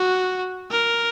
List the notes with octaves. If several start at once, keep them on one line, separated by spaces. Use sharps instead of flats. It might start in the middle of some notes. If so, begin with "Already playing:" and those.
Already playing: F#4
A#4